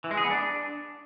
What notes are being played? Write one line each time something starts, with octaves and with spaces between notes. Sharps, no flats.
E3
G#3
G#4
B3
D4